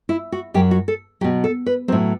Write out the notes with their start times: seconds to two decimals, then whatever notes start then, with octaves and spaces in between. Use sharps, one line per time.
0.09 E4
0.32 F#4
0.54 F#2 F#3 G4
0.71 F#4
0.88 A4
1.21 F#3 G4
1.24 B2
1.44 A4
1.66 B4
1.88 A2 F#3 C4